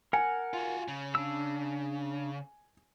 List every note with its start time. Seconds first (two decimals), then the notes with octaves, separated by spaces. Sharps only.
0.13 A#4 F#5 G#5
0.53 F4 F#4
0.88 C#3
1.15 D4 E6